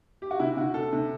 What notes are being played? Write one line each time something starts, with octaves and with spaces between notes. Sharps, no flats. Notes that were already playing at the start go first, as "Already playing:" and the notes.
G4
F#4
C3 E4
C3 F#4
C3 A4
C3